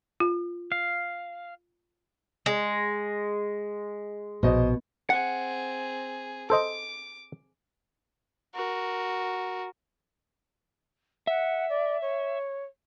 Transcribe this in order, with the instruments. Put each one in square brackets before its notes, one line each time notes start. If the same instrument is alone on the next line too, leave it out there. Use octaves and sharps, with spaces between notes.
[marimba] F4
[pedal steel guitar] F5
[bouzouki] G#3
[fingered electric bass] A#1 [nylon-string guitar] B2 [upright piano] C5 D#5
[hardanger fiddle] C4 G#4 [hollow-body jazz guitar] F#5
[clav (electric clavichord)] A4 C5 D#5 [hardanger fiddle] D6
[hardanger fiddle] F#4 A#4
[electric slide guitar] E5 [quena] F#5
[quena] D5
C#5